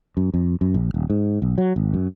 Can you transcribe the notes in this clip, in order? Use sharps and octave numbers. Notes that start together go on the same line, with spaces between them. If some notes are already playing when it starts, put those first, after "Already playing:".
F#2
F2
F#2
A#1
D#1
G#2
B1
F#3
G#1
F#2